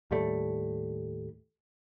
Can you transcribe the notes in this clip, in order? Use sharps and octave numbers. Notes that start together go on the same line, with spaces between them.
D#2 A2 G3 A3